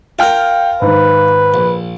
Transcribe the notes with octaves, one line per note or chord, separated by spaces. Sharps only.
F4 A#4 F5 G5 F6
G#2 D#3 B4
A#1